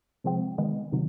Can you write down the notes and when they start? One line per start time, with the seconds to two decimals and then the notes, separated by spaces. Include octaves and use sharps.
0.24 C3 F3 G#3 C4
0.58 D#3 G#3 B3
0.92 C3 D#3 F#3